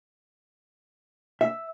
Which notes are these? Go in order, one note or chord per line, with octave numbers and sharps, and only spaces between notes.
E5